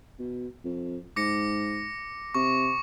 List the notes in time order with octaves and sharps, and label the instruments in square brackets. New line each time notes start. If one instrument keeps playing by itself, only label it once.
[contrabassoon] B2
F2
[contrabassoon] G#2 [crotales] D6 A#6 C#7
[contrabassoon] C3 [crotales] C#6